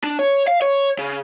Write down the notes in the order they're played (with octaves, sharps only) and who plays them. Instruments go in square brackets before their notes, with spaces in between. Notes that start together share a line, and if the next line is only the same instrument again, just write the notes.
[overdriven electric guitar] D4
C#5
F5
C#5
C#3